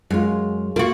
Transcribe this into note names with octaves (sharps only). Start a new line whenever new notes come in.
F#2 G#3 F4
A#3 F4 F#4